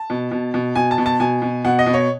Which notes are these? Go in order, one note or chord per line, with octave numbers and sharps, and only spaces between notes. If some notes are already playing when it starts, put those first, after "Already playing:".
Already playing: A5
B2
B2
B2
B2 G#5
A5
B2
A5
B2 G#5
B2
B2 F#5
D#5
B2
C#5